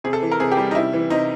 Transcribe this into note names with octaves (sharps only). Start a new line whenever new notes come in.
C3 G#4
A4
E3
A#4
C3 G#4
G4
G3
D#4
C3 E4
E3
C3 D#4